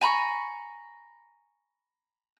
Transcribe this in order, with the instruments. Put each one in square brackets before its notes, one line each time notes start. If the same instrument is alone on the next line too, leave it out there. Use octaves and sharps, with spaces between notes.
[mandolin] G#5 A#5 B5 C#6